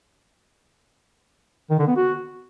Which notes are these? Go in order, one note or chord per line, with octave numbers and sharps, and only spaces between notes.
D#3
D3
B3
F#4